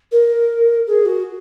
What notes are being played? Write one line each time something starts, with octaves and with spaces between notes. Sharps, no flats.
A#4
G#4
F#4